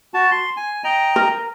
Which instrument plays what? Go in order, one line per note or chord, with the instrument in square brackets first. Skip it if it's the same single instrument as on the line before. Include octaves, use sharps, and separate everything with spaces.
[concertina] F#4 A5
C6
G#5
D#5 G5 A#5
[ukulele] A#4